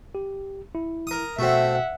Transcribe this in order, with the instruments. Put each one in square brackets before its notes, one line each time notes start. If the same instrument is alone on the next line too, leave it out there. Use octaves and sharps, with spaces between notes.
[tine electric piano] G4
E4
[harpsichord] A#4 D#6
[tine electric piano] B2 F#4 [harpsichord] A3 C4 [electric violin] E5 F#5